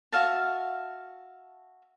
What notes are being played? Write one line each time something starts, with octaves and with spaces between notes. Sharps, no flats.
F#4 E5 F5 A5